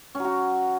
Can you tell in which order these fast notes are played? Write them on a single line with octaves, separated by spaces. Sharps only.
C#4 F#3 F#4